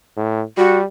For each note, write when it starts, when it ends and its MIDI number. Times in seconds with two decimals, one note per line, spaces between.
0.17 0.42 45
0.57 0.84 55
0.57 0.77 66